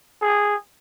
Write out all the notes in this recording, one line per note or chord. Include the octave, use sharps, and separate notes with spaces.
G#4